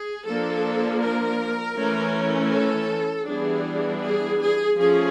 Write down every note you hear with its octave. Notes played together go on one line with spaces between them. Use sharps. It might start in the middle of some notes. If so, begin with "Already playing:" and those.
Already playing: G#4
F3 A#3 D4 A4
A#4
E3 A3 C#4
A4
E3 G3 B3 D4 G#4
G#4
G#4
F3 A3 C#4 G#4